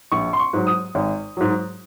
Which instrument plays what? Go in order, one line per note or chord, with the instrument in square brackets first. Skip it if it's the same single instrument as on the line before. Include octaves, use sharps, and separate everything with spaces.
[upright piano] A#1 C#6
C6
C#6
G#2 F#3
D#6
G#1
G#2 F#3